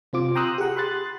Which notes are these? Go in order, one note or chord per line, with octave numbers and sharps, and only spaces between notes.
C3 C4 F4 D6
G5 A#5 C6 D#6 E6 F#6
G4 G#4 F#5
B5 C6 F#6 A6